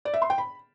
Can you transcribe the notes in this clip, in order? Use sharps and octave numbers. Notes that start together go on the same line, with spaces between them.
D5
E5
C6
G5
B5